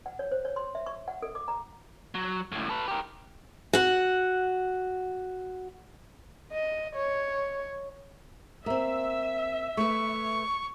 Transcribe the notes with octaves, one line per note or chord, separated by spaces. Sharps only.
F#5
C#5
C5
C#5
C6
E5
C#6
F#5
A4
D6
A#5
F#3
C#2 A2
A4 B4
G4 A#4
F#4 F#5
D#5
C#5
A#3 C4 E5
A3 B4 C#6